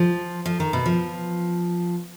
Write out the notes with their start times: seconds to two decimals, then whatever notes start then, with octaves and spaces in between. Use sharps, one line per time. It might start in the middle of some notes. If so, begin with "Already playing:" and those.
Already playing: F3
0.46 F3
0.60 D#3
0.73 B2
0.86 F3